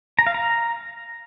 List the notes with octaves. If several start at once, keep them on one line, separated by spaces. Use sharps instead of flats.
A#5
F5
A#5